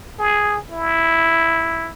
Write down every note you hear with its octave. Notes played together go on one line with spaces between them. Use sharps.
G#4
E4